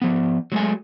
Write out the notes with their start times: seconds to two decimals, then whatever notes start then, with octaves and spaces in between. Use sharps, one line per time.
0.02 F3 B3
0.52 F#3 G#3 A3 G#5